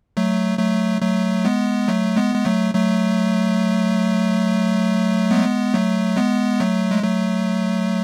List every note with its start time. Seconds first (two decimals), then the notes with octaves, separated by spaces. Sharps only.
0.17 F#3 A3
0.59 F#3 A3
1.02 F#3 A3
1.45 G#3 B3
1.88 F#3 A3
2.16 G#3 B3
2.35 G#3
2.45 F#3 A3
2.74 F#3 A3
5.31 G#3 B3
5.74 F#3 A3
6.17 G#3 B3
6.60 F#3 A3
6.91 G#3
7.03 F#3 A3